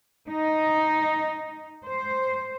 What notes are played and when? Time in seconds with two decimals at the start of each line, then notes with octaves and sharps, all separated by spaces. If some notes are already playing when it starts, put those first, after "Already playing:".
0.27 D#4
1.84 C5